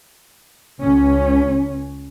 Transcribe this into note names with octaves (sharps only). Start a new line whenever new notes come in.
C#2 C#4